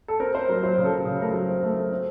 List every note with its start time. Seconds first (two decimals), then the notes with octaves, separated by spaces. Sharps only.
0.08 A4
0.20 C4 A#4
0.35 C4 C5
0.49 F#3 A#4
0.63 F#3 C5
0.78 C#3
0.84 A4
0.92 F#3
1.05 C#3
1.20 A3 A#4
1.27 A4
1.34 F#3
1.49 C4
1.63 A3
1.77 A3
1.90 C4